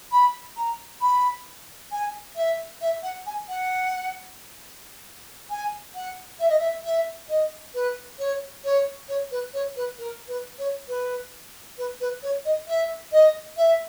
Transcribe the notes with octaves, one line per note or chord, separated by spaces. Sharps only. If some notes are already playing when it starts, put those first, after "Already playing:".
B5
A#5
B5
G#5
E5
E5
F#5
G#5
F#5
G#5
F#5
E5
D#5
E5
E5
D#5
B4
C#5
C#5
C#5
B4
C#5
B4
A#4
B4
C#5
B4
B4
B4
C#5
D#5
E5
D#5
E5